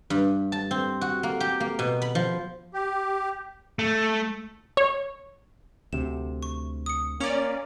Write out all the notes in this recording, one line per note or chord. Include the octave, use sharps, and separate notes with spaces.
G2
A5
C4
F#4
A#3
G4
A#3
B2
B5
F3
G4
A3
C#5
D2 C3 E7
C#6
D#6 C#7
A#3 C#4 C#5 D5 C#7 F7